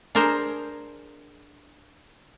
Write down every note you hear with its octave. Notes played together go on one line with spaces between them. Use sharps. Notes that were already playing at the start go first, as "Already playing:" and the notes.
D4 G#4 A#4 C5 G#5